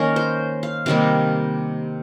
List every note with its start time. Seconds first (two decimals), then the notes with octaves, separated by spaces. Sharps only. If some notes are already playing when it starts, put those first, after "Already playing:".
Already playing: D#3 A#3 C#4 A#4
0.16 C5
0.63 F5
0.86 C3 D#3 G3 A#3 F5